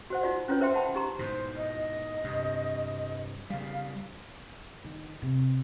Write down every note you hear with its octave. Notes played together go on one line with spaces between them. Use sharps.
F#4 C5 F#5
D#4 F4 F#4 D5
C#4 E4 F4 B4 C#5
A#4 C5 E5 G5 C6
F#5 A5 B5
D#4 G4 A#5 C6
G#2 B2 C5
D#5
G2 C3
C#3 G3 F5
D#3
C3